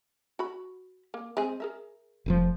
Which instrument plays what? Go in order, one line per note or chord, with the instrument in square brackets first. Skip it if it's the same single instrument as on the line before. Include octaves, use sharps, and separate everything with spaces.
[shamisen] F#4 B5
A#3
G#3 C4 G#4
G#4 A#4 E5
[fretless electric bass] F1 A#2 F3